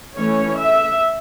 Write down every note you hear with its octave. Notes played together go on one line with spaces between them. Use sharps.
E3 A3 C#4 C#5
E5